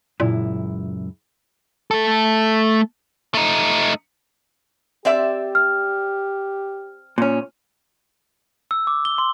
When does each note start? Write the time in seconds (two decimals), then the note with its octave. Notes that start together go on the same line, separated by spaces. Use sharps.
0.20 C#2 F#2 A#2 E4
1.91 A3 A4
3.34 A3 D#4
5.05 C4 G4 D5 E5
5.55 F6
7.18 A#2 C#4
8.71 E6
8.87 D6
9.05 G7
9.18 C6